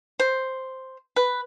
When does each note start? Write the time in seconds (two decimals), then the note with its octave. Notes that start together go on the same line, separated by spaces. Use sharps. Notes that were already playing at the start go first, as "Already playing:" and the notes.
0.20 C5
1.16 B4